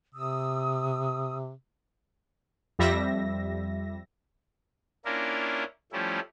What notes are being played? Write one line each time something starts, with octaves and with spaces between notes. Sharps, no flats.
C3 D#6 E6
F2 G3 E5 A#6
A#3 C#4 D4 E4 F4 A#4
F3 G3 A3 C#4 E4